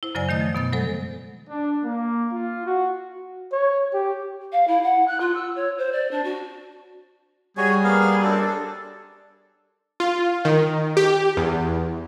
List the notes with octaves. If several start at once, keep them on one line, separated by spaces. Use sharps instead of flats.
E4 C5
F#2 C#3 F#3 C5 D5 G#5
D#3 A3 D#5 D#6
F3
B2 B3 A6
F#3 G#3 A4 C5
D4
A#3
F4
F#4
C#5
G4
F5
E4
F#5
F#6
F4
E6
C#5
C5
D5
D4
F#4
G3 F#4 G#4 C#5 G#5
A#3 B3 F5
F#2 C4 D4 A4
D4 A4
F4
D#3
G4
E2